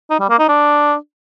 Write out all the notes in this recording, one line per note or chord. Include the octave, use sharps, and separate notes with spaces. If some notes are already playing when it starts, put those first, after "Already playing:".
D#4
G3
A#3
D#4
D4